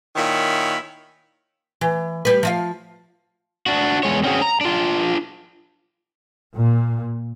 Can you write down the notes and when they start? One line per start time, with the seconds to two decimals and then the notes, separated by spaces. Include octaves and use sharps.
0.16 A#2 D#3 E4 C#5 B5
1.81 E3
2.25 G3 B4
2.43 F3 D#5 F5
3.66 D4 F#4
4.03 E2 G#3 C#5
4.24 C4 C#4 F#4 G#4
4.42 A#5
4.61 D4 F4
6.55 A#2